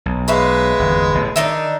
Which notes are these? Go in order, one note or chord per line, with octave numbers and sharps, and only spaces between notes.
B1
G#3 C#4 B4 E5 F5
G1 E2
A1 B2
D#3 D4 D#4 E5